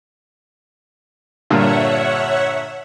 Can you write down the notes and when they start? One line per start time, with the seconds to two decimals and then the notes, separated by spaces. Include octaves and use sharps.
1.50 G2 A#2 D3 C#5 E5 F#5